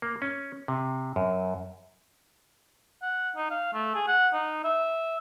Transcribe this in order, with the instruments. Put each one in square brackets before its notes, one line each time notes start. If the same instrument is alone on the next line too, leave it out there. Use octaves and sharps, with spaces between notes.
[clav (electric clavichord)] A#3
C#4
C3
F#2
[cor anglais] F#5
D#4
F5
A3
G#4
F#5
D#4
E5